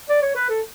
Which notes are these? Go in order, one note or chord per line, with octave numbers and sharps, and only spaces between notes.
D5
C#5
B4
A4